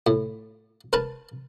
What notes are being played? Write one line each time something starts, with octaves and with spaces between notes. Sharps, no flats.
A2
A#4 B4 A5